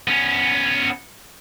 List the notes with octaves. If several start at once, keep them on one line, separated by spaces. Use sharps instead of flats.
B3 C#4